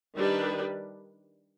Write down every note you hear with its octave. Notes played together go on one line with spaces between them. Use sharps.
D#3 G3 D4 G4 B4